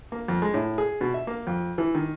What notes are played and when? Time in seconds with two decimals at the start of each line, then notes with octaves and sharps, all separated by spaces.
0.12 A#3
0.28 F2
0.42 G#3
0.54 A2
0.78 G#4
1.01 B2
1.14 E5
1.27 A#3
1.47 F2
1.78 E3
1.95 D#3